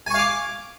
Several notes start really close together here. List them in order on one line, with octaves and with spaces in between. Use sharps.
G#5 C#6 F5 D6